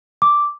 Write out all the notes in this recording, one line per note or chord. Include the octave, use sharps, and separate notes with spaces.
D6